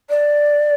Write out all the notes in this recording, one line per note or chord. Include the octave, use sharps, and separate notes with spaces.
D5